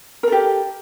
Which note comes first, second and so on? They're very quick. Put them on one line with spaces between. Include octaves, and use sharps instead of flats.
A#4 A4 G4